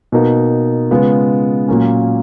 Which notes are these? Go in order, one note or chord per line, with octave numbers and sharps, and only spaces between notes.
B2 A#3 D#4 A#4
C#3 G#3 B3 F4
A#2 F#3 A#3 C#4